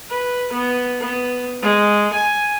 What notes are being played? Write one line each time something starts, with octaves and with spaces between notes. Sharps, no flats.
B4
B3
B3
G#3
G#5